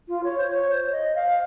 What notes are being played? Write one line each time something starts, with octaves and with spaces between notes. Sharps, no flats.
F4
C#5
C5
C#5
C5
D#5
F5